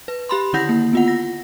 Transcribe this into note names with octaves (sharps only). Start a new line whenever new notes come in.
B4
G4 B5 C6
D3 D#3 E4 F#5 G6 A#6
A#3
B3 F4 F#5
A#6